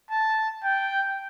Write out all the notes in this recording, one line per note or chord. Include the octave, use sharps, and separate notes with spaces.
A5
G5